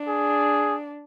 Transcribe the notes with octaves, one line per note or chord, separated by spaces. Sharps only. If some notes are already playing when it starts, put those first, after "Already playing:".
Already playing: D4
G#4